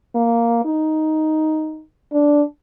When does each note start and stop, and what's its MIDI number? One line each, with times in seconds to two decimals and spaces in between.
0.15 0.62 58
0.65 1.82 63
2.13 2.42 62